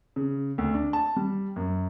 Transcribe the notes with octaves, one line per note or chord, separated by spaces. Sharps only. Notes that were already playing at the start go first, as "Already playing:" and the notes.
C#3
D2
D4
A5
G3
F#2